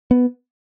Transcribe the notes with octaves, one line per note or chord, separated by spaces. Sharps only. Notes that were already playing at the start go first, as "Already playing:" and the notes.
B3